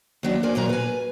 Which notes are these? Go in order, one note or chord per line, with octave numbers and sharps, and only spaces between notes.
D#2 F#3 D4
F2 A#3 D5 G#5
D#2 A#2 F#3 A#5
B4 G#5